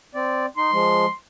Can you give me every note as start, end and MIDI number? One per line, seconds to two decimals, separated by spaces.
0.15 0.46 60
0.15 0.46 74
0.57 0.71 63
0.57 1.13 84
0.72 1.06 53
0.72 1.06 56